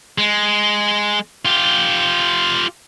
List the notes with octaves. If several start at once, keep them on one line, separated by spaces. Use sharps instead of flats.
G#3
F4 G4